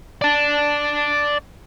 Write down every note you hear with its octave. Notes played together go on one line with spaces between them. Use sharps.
D5 A5